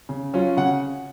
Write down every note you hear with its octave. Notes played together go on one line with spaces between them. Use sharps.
C#3
F#3 C#4 F4
C#3 F#5